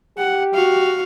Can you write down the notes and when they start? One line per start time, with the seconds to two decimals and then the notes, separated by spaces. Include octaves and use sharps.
0.18 G4 F#5
0.54 F#4 F5